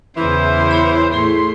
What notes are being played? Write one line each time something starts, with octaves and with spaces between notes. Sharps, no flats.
E2 C#3 E3 C5
E4 C#5 B5
A2 A3 E4 G#4 C6